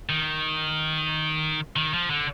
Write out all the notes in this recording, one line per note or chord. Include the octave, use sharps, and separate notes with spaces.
D#3
D#3
F3
D3